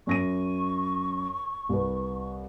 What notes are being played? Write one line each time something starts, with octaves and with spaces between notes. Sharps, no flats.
F#2 C#6 A#6 D#7
C2 B4